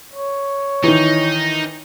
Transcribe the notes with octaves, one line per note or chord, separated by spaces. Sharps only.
C#5
D#3 E3 D#4